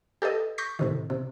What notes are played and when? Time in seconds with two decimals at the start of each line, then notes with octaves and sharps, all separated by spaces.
0.22 G4 A4 B4 D#5
0.58 C#6 G6 A#6 B6
0.79 A2 C3 D#3
1.10 C3